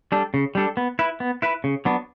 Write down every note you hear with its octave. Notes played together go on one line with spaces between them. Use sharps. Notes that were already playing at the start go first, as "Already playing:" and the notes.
G3 D4 A4
C#3
G3 D4 A4
B3
E4 B4
B3
E4 B4
C#3
F#3 B3 D4